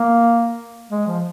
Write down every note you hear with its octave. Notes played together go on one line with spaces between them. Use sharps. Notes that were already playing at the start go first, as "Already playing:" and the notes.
Already playing: A#3
G#3
F3